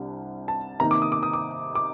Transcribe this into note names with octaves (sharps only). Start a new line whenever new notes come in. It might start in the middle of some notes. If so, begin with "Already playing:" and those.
Already playing: C2 C3 G3 D4
A5
C3 D#3 A#3 D#4 A#5
D6
D#6
D6
D#6
D6
D6